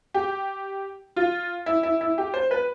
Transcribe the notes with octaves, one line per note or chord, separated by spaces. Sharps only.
G4
F4
E4
E4
E4
G4
C5
B4